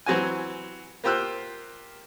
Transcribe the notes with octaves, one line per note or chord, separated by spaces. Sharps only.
E3 F#3 C4 F#4 G#5
A#3 F4 G4 C5 E6 F#6